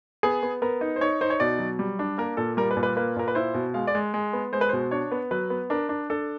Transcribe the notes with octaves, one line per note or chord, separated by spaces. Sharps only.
B3 G#4
B3
B3 A#4
D#4
C5
D#4 C#5
D#4 C5
C#5
B2 D5
F#3
G3
D4
A#3 A#4
A#2 A4
G3 A#4
B4
A#2
B4
A#3 B4
A#2 A#4
B4
E4 C5
B2
G#3 F5
D5
G#3
G#3
B3
G#3 C5
B4
B2 C5
D4 C#5
B3
F#3 B4
B3
D4 A#4
D4
D4 A4